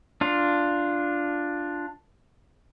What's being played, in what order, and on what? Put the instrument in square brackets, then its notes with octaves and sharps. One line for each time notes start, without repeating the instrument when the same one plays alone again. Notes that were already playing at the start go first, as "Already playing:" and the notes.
[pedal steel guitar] D4 F4